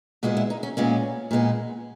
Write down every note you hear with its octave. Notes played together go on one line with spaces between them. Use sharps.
A#2 G#3 B3 F#4
E4
D#4
C#4
A#2 G#3 B3 C#4
A#2 G#3 B3